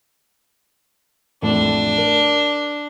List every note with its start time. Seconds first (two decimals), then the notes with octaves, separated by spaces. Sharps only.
1.42 A1 F2 A2 D4
1.97 A#4